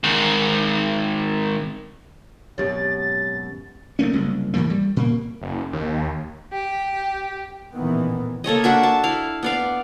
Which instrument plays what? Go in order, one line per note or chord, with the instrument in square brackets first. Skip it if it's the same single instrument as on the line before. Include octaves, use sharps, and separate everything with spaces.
[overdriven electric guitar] G#2 D#3
[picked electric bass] G#1 F#2 B2 [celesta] G4 C#5 [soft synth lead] A6
[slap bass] B1 A3 A#3 C#4
F#1 C2
G#2 E3 F3 A#3
G3
A#2 A#3
[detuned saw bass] F#1
D#2
[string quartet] G4
[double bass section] A1 A#2 D#3 E3 B3
[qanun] A#3 A4 C#5 D#5
D4 F#4 E5
A5
E4 F5
B3 D5 F5